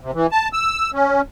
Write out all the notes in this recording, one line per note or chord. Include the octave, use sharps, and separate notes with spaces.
C3
E3
A5
E6
C#4